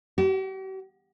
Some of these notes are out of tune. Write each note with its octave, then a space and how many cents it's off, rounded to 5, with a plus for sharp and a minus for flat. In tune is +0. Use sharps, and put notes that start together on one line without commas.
G4 -45